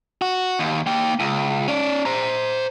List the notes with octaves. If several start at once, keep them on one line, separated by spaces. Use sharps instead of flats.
F#4
D#2
A#3 G5
C#2
C#4 D5
C5 A#5